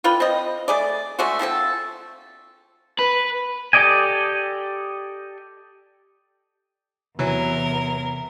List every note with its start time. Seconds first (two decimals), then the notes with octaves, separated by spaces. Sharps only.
0.04 D3 F4 B4 G5
0.20 C4 D#5
0.68 A3 G#4 D5
1.19 G#3 A3 D4 F#4
1.39 F3 C4 G#4 A4
2.99 B4
3.73 G4 A4 D5 D#5 G#5
7.19 E2 C3 E3 F#3 A#4